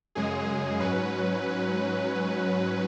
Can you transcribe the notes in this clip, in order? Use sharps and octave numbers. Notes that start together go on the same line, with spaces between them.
F#2 C#3 G#3 G#4
G#4
G#2 F#3 C#4 B4